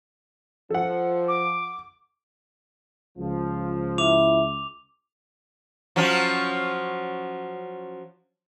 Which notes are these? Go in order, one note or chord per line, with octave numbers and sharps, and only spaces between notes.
F3 A4 F#5
D6
C#2 F3
E4 D6 F7
F3 F#3 C#4